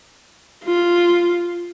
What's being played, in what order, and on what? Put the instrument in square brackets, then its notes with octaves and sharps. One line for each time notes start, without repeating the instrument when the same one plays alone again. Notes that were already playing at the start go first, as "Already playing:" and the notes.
[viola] F4